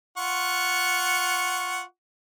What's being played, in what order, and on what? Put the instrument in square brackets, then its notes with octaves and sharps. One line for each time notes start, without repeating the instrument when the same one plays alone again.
[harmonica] F4 F#5 C#6